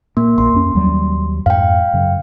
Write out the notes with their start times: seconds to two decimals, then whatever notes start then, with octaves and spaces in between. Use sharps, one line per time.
0.17 A#2 A#3
0.38 A#1 A#2 C6
0.54 F2 C#4
0.75 D#2 F#3 G3
1.46 F2 G#2 F5 G5
1.93 F#2 C#3